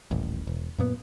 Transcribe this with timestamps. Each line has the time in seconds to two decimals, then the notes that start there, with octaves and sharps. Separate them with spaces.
0.11 D#1 A1
0.47 E1
0.78 F#2 A#2 B3